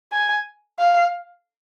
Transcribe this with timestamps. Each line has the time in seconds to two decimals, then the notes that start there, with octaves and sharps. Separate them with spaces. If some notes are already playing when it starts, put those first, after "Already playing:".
0.12 G#5
0.79 F5